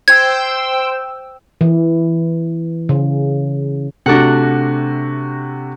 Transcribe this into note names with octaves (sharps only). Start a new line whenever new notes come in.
C5 G5 E6 G#6
E3
C#3
C3 A3 D4 F#4 F#5